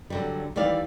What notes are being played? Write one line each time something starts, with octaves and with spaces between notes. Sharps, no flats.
D3 F#3 G3
D#2 E3 G3 D5 F5